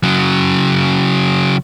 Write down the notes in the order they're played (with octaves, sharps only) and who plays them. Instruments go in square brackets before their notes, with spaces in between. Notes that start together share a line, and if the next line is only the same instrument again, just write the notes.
[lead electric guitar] C#3 F#3